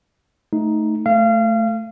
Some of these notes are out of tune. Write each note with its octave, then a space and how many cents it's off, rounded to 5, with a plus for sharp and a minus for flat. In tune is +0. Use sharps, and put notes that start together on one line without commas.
A3 +0 D#4 +5
A3 +0 F5 -30